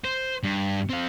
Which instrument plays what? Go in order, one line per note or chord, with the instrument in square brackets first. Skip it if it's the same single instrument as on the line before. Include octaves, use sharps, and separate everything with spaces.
[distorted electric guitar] C5
G2
C4 F5